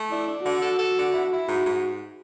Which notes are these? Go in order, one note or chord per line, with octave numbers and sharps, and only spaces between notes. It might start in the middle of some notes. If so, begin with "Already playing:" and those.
Already playing: A3
D4 E4
D4
D3 F#4
A4
A4
D3
E4
E4
G#2 F#4
G#2